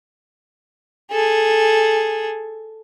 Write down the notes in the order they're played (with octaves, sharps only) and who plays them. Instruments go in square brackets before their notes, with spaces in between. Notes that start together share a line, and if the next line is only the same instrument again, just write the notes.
[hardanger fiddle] G#4 A4